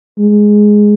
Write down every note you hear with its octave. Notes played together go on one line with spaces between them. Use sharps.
G#3